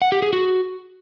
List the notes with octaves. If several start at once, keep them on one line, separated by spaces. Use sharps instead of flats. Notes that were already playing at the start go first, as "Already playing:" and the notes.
F#5
G4
G#4
F#4